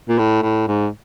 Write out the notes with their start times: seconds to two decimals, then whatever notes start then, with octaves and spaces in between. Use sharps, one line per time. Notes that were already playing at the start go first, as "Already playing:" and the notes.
0.09 A#2
0.18 A2
0.42 A2
0.68 G#2